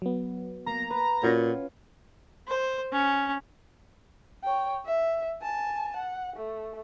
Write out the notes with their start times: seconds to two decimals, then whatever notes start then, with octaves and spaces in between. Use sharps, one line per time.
0.02 F#3 B3
0.66 A#3 A#5
0.90 B4
1.23 A#2 C#4 F4 F#4 C#5
2.47 C5
2.92 C#4
4.43 C#5 G5
4.86 E5
5.42 G#5 A5
5.97 F#5
6.36 A3